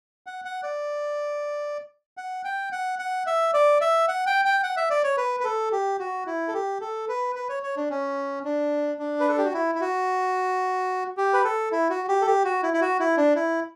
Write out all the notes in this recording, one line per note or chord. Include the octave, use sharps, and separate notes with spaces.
F#5
F#5
D5
F#5
G5
F#5
F#5
E5
D5
E5
F#5
G5
G5
F#5
E5
D5
C#5
B4
B4
A4
G4
F#4
E4
A4
G4
A4
B4
B4
C#5
C#5
D4
C#4
D4
D4
B4
A4
G4
F#4
E4
E4
F#4
G4
B4
A4
E4
F#4
G4
A4
G4
F#4
E4
E4
F#4
E4
D4
E4